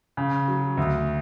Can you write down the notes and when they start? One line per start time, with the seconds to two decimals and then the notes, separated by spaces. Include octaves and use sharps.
0.17 C#3
0.48 F#3
0.77 D2